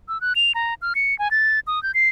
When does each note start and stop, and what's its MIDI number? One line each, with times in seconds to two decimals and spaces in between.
0.08 0.20 88
0.21 0.33 90
0.36 0.52 101
0.55 0.74 82
0.82 0.93 89
0.95 1.17 97
1.19 1.31 80
1.31 1.60 93
1.67 1.82 87
1.83 1.92 91
1.94 2.09 96